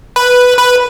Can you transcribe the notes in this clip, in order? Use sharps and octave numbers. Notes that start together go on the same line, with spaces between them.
B4
B4